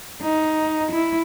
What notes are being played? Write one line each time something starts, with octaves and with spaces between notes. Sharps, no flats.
D#4
E4